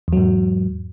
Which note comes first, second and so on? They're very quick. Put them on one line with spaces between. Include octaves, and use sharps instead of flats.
E2 F#3 G#2